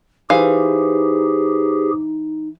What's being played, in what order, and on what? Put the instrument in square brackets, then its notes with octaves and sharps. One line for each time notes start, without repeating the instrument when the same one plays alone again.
[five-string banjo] E3 F5 [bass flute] D#4 [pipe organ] G4 G#4 [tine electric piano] B4 C5